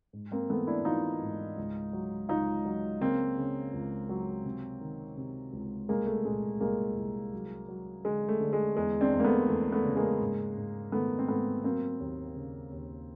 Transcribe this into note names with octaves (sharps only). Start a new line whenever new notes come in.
G#2
A#3 C4
E3 A3 B3
D4 E4
E3 D#4 F4
G#2
C#2
F#3
C#2 D#4 F4
F#3
C#3 A#3 C4
C#3
C#2
F#3
C3
D#3
C3
C#2
C2 G#3 A#3
A3
A#2 G#3
C2 G#3 A#3
C2
F#3
F#3
D3 G#3
A3
D3
G#3
E2 G#3
C4 D4
E2
A#3
A3 B3
E2 A3
A3 B3
C#3
G#3 A#3
G#2
G#2
D#3 A3 B3
C4
G#2 A3 B3
F#3 A#3 C4
D#2
C#3
D#2